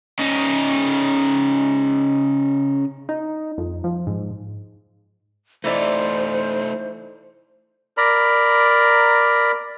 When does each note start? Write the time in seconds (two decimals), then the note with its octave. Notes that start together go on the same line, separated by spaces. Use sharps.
0.19 C#3 D#4
3.09 D#4
3.58 F2
3.84 F3
4.07 G#2
5.64 E3 A3 D#4 C5 D5
7.97 A#4 D5 A#5 B5